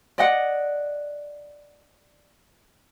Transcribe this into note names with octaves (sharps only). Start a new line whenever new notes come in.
D5 D#5 F#5